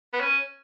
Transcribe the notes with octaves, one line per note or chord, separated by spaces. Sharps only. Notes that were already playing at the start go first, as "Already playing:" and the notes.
B3
C#4